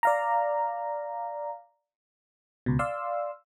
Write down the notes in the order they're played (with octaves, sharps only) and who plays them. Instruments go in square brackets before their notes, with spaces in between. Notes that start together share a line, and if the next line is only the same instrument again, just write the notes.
[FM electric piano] D5 F5 A#5
C#2 B2
D5 F5 C6 E6